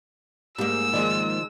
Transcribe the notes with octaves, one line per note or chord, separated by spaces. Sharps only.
G#2 G3 A#3 E6
D#3 F3 G#3 D5